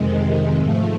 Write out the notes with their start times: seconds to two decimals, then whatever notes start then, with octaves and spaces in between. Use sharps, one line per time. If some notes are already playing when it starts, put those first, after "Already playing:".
Already playing: F2 C3 D#3 G#3
0.57 G#2 F3 A3